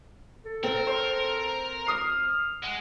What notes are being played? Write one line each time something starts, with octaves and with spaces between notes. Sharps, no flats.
A4
C4 A#4
C5
D#6 F6 C7
G#3 F#5